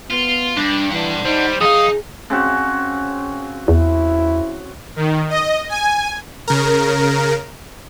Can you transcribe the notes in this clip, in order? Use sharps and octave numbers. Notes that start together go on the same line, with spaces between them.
B3 F4
G2 D4
E3 D5 F#5
G3 D#4 C5
F2 D#4 G#4 F5 D#6
C#3 C4 F#4
E2 E4
D#3
D#5
G#5
C#3 A#4